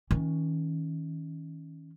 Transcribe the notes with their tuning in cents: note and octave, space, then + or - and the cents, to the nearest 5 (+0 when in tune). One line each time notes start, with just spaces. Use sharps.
D#3 +35 C#4 +0